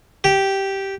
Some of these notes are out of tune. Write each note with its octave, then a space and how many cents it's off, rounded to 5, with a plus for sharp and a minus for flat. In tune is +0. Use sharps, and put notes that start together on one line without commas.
G4 -10